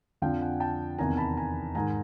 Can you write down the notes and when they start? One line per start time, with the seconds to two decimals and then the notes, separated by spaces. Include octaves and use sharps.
0.22 F2 D3 F3 F5 G5
0.41 F#5 G#5
0.60 G5 A5
0.98 E2 C3 D#3 G#5 A#5
1.17 A5 B5
1.37 G#5 A#5
1.75 G#2 D#3 G#5 A#5